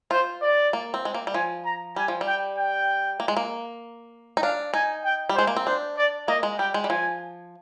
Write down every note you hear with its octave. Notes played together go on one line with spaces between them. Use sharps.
F4 C5
D5
A#3
C4
G#3
A#3
G3
F3 G#5
A#5
G3 G#5
F3
G3
G5
G5
A#3
G#3
A#3
D#4
D4 F5
D#4 G#5
G5
G3
G#3 C5
A#3
C4
D4 C5
D5
A#3 D#5
G#3
G3 G5
G#3
G3
F3 G#5